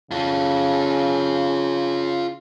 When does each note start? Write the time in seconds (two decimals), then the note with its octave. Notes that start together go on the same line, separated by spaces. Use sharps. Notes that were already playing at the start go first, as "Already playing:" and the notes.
0.11 C#3 F4 A4